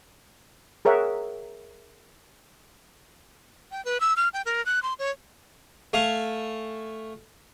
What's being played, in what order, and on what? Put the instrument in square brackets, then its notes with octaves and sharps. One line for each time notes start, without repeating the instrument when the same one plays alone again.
[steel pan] G#4 A#4 C#5 E5 F#5
[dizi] G5
B4
E6
F6
G5
A#4
F#6
C6
C#5
[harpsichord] A3 F5 G#5